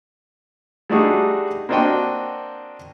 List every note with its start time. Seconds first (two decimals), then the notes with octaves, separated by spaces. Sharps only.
0.90 G3 A3 D4 D#4 F#4 G#4
1.69 A#3 C4 D4 F#4 D#5 G5